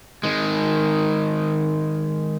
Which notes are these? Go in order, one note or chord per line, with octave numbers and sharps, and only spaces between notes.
D#3 G#3